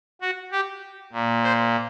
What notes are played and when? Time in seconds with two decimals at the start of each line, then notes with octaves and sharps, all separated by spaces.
0.22 F#4
0.51 G4
1.13 A#2
1.43 C5